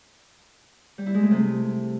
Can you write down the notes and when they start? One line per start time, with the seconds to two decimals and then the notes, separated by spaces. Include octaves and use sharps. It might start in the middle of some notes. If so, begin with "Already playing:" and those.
0.98 G3
1.06 E4
1.14 G#3
1.23 A3
1.31 C3